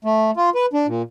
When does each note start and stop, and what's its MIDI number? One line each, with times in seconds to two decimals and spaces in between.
0.04 0.31 57
0.37 0.50 65
0.55 0.66 71
0.73 0.87 62
0.87 1.02 46